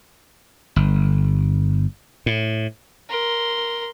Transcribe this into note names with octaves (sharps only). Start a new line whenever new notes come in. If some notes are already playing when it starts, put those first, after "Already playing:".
G1
A2
A#4 C6